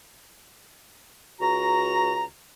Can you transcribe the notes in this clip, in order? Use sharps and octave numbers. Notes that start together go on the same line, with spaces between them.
C#2 F#4 A#5